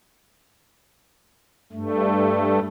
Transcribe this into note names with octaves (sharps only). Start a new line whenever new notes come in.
G2 A3